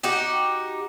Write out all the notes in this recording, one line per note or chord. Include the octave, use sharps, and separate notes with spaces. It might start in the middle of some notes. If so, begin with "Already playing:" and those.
D#4 F#4 G4